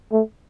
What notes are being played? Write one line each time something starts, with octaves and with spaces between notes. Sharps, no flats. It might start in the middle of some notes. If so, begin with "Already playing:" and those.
A3